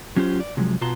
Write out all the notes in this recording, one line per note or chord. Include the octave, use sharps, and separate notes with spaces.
F#3 C#4 F4 G4 C5
D5
C3 F3 F#3 G#3
B2 B3 F4 A5 A#5 C6